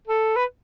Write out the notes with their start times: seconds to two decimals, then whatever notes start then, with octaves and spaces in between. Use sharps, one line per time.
0.08 A4
0.36 B4